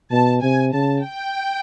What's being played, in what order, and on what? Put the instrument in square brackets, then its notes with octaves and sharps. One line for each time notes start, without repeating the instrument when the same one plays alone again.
[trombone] B2 [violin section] A5
[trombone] C3 [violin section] G#5
[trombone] C#3 [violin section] A5
[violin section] G5